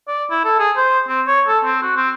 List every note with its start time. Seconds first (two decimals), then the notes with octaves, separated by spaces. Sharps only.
0.08 D5
0.30 E4
0.44 A4
0.59 G#4
0.77 C5
1.08 C4
1.27 C#5
1.48 A4
1.64 C4
1.82 F#4
1.96 C4